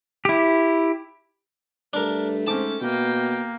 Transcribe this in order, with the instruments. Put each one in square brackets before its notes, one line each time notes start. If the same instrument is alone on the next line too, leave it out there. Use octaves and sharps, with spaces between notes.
[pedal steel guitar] E4 G4
[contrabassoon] G2 [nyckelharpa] A3 [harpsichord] D4 A#4
[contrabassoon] G#2 [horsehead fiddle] C4 C#4 [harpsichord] A5 D6
[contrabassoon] B2 [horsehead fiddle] A#3 [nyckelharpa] G5